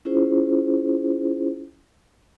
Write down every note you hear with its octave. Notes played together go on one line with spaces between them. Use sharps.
C#4 E4 F4 G#4 C5